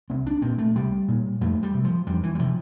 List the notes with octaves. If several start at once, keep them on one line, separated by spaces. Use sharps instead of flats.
C2 C4
D4
A#2 C4
A3
C2 G3
A#2
F2 A3
G3
C3
F3
F2 G3
E3
G3
C3 F3